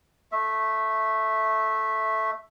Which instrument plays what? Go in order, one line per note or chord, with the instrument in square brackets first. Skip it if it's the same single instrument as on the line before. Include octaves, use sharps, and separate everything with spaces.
[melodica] A3 E5